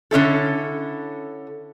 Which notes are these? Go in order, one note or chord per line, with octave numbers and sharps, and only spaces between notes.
D3 C#4 E4 A4